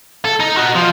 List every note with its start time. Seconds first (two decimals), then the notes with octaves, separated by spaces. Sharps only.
0.25 A4
0.40 D#4
0.57 F#4 D#5
0.75 F3